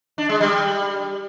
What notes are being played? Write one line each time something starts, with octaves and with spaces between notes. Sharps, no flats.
D4
G#3
G3